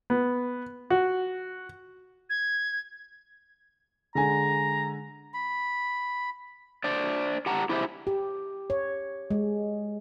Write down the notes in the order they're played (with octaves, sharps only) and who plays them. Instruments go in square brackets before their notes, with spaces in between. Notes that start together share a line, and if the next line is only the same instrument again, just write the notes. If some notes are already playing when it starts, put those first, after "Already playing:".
[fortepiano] B3
F#4
[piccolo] G#6
[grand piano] D3 G#3 G#5 [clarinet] A#5
[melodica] B5
[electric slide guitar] D4 C5 D5
G4 F#5 A5 A#5
E4 G4 G#4 C5 D5 E5
[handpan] G4
C#5
G#3